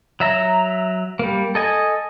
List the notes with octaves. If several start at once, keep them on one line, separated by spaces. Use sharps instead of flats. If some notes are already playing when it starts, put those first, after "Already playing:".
F#3 E5 A#5
G3 A#3
A4 D#5 G#5